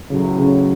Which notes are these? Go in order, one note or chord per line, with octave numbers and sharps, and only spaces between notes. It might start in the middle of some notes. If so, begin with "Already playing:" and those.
A1 A2 C#3 F#3
C#3